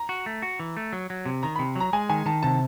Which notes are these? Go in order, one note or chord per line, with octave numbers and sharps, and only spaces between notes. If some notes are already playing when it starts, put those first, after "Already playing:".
Already playing: A#5
F#4
A3
F#4
E3
A3
F#3
F#3
C3
D#3 A#5
C3 B5
F#3 A#5
G#3 G#5
D#3 G#5
D#3 A5
C3 A5